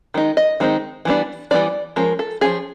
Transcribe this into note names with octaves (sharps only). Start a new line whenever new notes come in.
D#3 G#3 D#4
D#5
D#3 G#3 C4 D#4
E3 G3 B3 D4
E3 G3 B3 D4 D5
F3 G#3 C#4 A#4
A4
F3 G#3 C#4 G#4